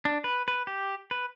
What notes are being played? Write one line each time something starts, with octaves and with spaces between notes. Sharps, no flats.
D4
B4
B4
G4
B4